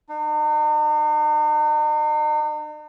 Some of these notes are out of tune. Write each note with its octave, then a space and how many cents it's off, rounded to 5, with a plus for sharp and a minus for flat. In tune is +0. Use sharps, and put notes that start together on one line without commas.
D#4 -45